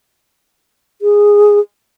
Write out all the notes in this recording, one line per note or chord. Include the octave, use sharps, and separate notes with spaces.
G#4